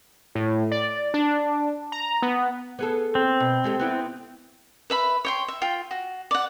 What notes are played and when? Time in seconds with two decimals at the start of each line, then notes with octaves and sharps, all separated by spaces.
0.35 A2
0.71 D5
1.14 D4
1.92 A#5
2.22 B3
2.79 B3 G#4 A4
3.15 C4
3.40 B2
3.64 G#3 G4 A4
3.80 B3 E4 G4
4.90 B4 E5 B5
5.25 C#5 G5 C6
5.48 E5
5.62 F4 G5
5.91 F#4
6.31 D5 F#5